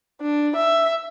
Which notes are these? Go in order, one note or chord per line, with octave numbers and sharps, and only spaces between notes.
D4
E5